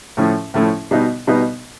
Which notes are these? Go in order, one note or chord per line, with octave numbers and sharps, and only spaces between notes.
A2 F3 A3 C#4 E4
A2 F3 A3 C#4 E4
B2 G3 B3 D#4
B2 G3 B3 D#4